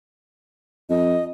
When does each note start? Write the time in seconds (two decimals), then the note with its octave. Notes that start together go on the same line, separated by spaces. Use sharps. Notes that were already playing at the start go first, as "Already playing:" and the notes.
0.90 F2 D#5